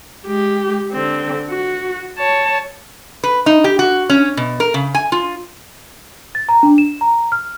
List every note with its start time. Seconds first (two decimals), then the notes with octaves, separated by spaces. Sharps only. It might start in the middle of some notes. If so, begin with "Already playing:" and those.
0.25 G#3 G4
0.92 D3 C4
1.50 F#4
2.18 C#5 A5
3.24 B4
3.46 D#4
3.64 G4
3.79 F#4
4.10 C#4
4.37 B2
4.60 A#4
4.74 C#3
4.95 G#5
5.12 F4
6.35 A6
6.49 A#5
6.63 D4
6.78 E7
7.01 A#5
7.32 F6